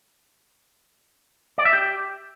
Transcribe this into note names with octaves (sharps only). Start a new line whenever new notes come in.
D5
E5
G4